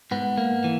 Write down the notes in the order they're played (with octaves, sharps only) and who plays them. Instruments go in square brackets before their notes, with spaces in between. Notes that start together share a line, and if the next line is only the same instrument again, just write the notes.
[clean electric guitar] G#2 B3
A#3
E3